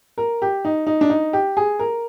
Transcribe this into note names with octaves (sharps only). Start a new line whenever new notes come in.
A#4
G4
D#4
D#4
D4
D#4
G4
G#4
A#4